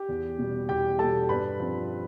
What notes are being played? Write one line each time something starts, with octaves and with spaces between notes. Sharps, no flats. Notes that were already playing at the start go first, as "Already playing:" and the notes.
Already playing: G4 G5
E2
B2 G3
E2 G4 G5
B2 G3 A4 A5
G2 B4 B5
F3 C4